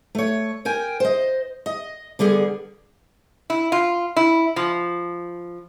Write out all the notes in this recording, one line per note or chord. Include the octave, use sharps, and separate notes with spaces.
A3 C#5
A#4 G5 G#5
C5 D#5
D#5
D3 G3 B3 G#4
E4
F4
E4
F3